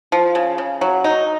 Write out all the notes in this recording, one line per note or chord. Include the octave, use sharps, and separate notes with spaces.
F3
C#3
C#3
F#3
D#4